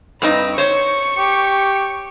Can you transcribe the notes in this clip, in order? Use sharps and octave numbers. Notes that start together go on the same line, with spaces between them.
G2 C4 D#4 B4
C5 C#5 C#6
G4